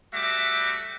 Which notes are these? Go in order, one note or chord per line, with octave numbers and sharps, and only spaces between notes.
G3 A3 F#4 E5 D6